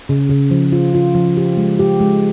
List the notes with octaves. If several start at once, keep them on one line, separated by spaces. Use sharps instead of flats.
C#3
C#3
F3
F4
F4
F3
G4
G#3
G4
G#3